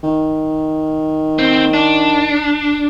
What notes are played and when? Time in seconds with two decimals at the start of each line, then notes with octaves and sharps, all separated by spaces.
0.03 D#3
1.39 C4
1.74 D4